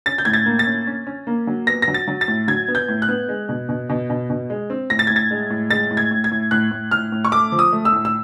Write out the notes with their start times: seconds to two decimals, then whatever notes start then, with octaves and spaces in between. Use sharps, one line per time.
0.06 C#4 A6
0.18 G6
0.25 A2 G#6
0.33 A6
0.46 A#3
0.59 A6
0.67 C#4
0.87 C#4
1.07 C#4
1.27 A#3
1.47 F#3
1.67 B3 A#6
1.82 A#6
1.88 F#3
1.94 A6
2.08 F#3
2.21 A6
2.28 A2
2.48 F#3 G#6
2.68 B3
2.75 G6
2.89 A2
3.02 F#6
3.08 B3
3.29 G#3
3.49 B2
3.69 B2
3.89 B2
4.10 B2
4.30 B2
4.50 G#3
4.70 C4
4.90 A2 A#6
4.99 A6
5.07 A2 G#6
5.16 A6
5.31 G#3
5.50 A2
5.70 G#3 A6
5.91 A2
5.97 G#6
6.11 A2
6.24 G#6
6.31 A2
6.51 A2 F#6
6.71 A2
6.91 A2 F6
7.12 A2
7.25 C#6
7.32 A3 D6
7.52 F3
7.59 D#6
7.73 A3
7.85 E6
7.93 A2
8.05 E6